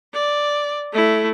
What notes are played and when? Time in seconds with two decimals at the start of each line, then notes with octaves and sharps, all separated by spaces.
0.14 D5
0.92 A3 E4